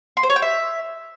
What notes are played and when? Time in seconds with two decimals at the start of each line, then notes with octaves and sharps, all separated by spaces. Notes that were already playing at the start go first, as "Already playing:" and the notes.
0.17 C6
0.23 C5
0.30 C#5
0.36 G5
0.42 E5